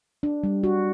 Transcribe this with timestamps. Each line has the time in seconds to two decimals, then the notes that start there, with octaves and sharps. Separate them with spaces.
0.23 D4
0.44 G3
0.64 F#4